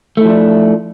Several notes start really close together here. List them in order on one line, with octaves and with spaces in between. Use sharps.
A3 E4 F3 D4